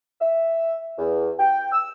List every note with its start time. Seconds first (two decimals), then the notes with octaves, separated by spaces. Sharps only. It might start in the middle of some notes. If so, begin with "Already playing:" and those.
0.20 E5
0.98 E2
1.39 G5
1.72 E6